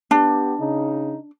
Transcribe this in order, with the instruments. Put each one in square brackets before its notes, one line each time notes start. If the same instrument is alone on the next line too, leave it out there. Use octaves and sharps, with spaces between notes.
[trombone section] B3 G4 [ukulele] D4
[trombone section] C#3 D#4